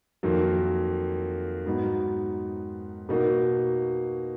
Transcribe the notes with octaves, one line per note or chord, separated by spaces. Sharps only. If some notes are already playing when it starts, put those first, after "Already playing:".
F2 D#3 F#3 A#3
G#2 F#3 B3 D#4 F#4
B2 A#3 D#4 F#4